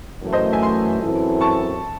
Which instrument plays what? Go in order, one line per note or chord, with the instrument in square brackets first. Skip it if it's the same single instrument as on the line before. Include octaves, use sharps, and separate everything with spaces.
[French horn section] F#2 E3 A3
[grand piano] C5 D#5
E5 G#5
G#5 C6
[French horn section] F#2 E3 C4 E4 A4
[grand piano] A5 C#6